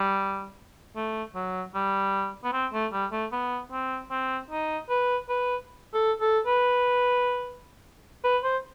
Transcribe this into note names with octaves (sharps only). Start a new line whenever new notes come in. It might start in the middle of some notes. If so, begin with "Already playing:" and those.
Already playing: G3
A3
F#3
G3
B3
C4
A3
G3
A3
B3
C4
C4
D#4
B4
B4
A4
A4
B4
B4
C5